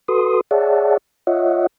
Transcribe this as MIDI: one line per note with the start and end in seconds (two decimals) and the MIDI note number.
0.08 0.41 66
0.08 0.41 69
0.08 0.41 71
0.08 0.41 84
0.08 0.41 87
0.51 0.97 68
0.51 0.97 73
0.51 0.97 74
0.51 0.97 76
0.51 0.97 78
0.51 0.97 81
1.27 1.67 65
1.27 1.67 73
1.27 1.67 75
1.27 1.67 76
1.27 1.67 78